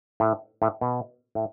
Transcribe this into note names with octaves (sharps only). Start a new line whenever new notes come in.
A2
A2
B2
A2